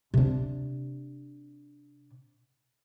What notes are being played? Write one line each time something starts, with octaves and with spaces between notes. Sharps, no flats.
C3 D4